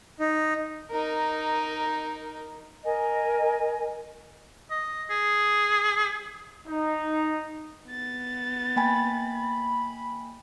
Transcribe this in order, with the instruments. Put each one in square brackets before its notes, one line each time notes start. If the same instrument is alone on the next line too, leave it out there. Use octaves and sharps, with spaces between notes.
[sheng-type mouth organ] D#4
[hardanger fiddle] D#4 A#4
[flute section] A#4 D#5 G#5
[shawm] D#5
G#4
[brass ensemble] D#4
[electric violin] B3 A6
[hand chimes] A#3 G5 G#5 [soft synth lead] B5